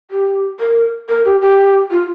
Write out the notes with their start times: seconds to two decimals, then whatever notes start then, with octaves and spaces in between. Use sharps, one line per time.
0.11 G4
0.60 A#4
1.09 A#4
1.25 G4
1.41 G4
1.91 F4